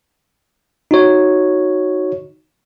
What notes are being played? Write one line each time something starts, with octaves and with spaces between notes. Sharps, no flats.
D#4 F#4 C#5